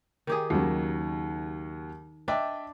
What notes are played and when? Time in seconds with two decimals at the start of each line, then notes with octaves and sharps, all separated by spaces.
0.27 D#3 G4 G#4
0.50 D#2 C#3 F#3
2.28 D4 D#5 E5 G5